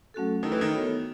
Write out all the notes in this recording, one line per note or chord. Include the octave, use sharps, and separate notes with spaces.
F#3 A3 C#4 F#4 A4
D#3 A3 E4 A4
E3
D#3
B3 F#4 A4 C#5